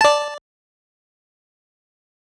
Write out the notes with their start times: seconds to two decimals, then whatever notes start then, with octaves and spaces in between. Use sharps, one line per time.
0.01 D5 A5